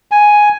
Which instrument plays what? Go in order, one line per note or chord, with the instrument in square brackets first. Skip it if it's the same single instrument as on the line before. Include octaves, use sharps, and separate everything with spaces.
[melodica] G#5